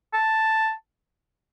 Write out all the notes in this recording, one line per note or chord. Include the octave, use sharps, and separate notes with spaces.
A5